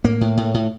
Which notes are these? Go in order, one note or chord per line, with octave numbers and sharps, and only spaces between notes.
A2 A#3
A2
A2
A2